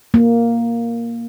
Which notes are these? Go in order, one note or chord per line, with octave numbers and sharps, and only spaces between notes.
A#3